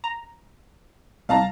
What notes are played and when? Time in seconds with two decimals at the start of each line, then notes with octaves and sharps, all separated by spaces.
0.04 A#5
1.29 C2 F5 A5 A#5